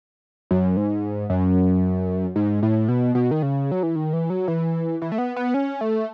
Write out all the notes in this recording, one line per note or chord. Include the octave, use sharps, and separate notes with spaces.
F#2
G#2
F#2
G#2
A2
B2
B2
D#3
C#3
F#3
E3
D#3
E3
F#3
E3
E3
A3
B3
B3
C#4
A3